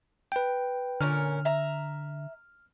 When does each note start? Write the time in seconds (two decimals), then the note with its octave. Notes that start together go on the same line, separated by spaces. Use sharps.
0.32 B4 G5
1.01 A#2 D3 C#4 A#4 F6
1.45 E5 A#5